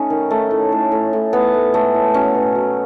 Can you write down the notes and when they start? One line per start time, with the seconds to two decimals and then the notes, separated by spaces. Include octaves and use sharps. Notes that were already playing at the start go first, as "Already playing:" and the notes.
Already playing: A3 C#4 D#4
0.10 D#3
0.31 A3
0.51 A2
0.72 A2
0.92 A2
1.13 A2
1.33 A2 B3
1.54 A2
1.74 G#3 A3
1.94 A2
2.14 F#3 C#4
2.35 B2
2.55 F#3